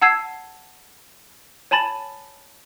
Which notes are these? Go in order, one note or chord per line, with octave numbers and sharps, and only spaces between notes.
F#5 A5 E6 G#6 C7
C#5 G#5 A5 B5 A6